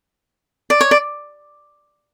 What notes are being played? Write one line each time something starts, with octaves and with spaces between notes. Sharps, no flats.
D5
C#5
D5